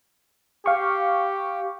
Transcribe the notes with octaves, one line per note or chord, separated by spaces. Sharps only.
G4 F5 C#6